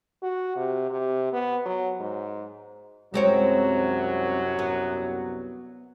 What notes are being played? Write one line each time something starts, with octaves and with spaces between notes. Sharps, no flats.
F#4
C3
C3
B3
F#3
G#2
C2 F#2 F#3 G#3 C4 C#5
B3